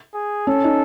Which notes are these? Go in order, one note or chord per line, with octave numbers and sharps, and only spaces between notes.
G#4
C#4 A4
D#4